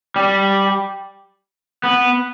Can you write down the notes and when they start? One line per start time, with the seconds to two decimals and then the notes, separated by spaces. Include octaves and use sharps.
0.16 G3
1.84 B3